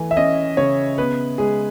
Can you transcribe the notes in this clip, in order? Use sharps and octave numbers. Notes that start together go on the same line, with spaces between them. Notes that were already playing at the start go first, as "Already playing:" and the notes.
Already playing: E3 A3 G#5
E5
C#4 D#5
C#3 C#5
B3 B4
G#3 G#4